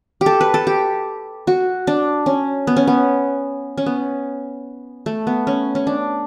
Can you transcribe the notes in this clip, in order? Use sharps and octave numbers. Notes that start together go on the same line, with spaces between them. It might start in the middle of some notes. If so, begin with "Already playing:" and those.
G4
A4
B4
A4
G4
F#4
D4
C#4
B3
C#4
B3
C#4
B3
A3
B3
C#4
C#4
D4